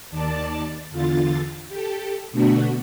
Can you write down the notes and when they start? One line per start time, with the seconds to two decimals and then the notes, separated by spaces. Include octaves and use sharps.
0.11 D#2 D#3 D5 A5
0.91 E2 D3 F4 A6
1.69 G4 A4
2.32 B2 D3 A3 B3 D4 F#4